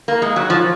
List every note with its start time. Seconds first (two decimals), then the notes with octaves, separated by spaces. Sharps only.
0.08 A#3
0.22 G#3
0.36 F#3
0.50 F3